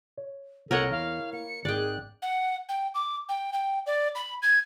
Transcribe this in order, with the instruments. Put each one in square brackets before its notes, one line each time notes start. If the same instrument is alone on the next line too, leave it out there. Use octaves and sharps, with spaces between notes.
[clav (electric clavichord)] C#5
[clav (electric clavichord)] C2 [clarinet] A4 [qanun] A#4 C#5 D#5 [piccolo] F#5
[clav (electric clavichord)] E2 [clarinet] E4 [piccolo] F5
[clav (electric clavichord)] A#3 [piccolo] C#7
[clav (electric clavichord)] G#1 D#3 [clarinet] G#4 [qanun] D5 G5 [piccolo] F#6
[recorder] F#5
G5
D6
G5
G5
D5
B5
G#6